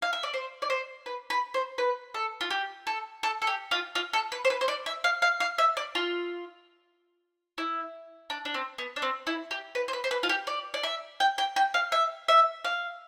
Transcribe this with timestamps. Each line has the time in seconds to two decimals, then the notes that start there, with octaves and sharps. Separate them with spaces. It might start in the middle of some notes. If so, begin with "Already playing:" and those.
0.02 F5
0.13 E5
0.23 D5
0.34 C5
0.62 D5
0.70 C5
1.06 B4
1.30 B4
1.54 C5
1.78 B4
2.14 A4
2.41 F4
2.51 G4
2.87 A4
3.23 A4
3.42 A4
3.47 G4
3.71 F4
3.95 F4
4.13 A4
4.32 B4
4.45 C5
4.50 B4
4.61 C5
4.68 D5
4.86 E5
5.04 F5
5.22 F5
5.40 F5
5.58 E5
5.77 D5
5.95 F4
7.58 E4
8.30 D4
8.45 D4
8.54 C4
8.78 B3
8.96 D4
9.02 C4
9.27 E4
9.51 G4
9.75 B4
9.88 C5
9.93 B4
10.04 C5
10.11 B4
10.23 F4
10.29 G4
10.47 D5
10.74 D5
10.83 E5
11.20 G5
11.38 G5
11.56 G5
11.74 F5
11.92 E5
12.28 E5
12.65 F5